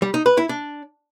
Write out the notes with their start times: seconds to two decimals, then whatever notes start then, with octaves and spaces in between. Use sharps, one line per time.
0.02 G3
0.14 D#4
0.26 B4
0.38 E4
0.49 D4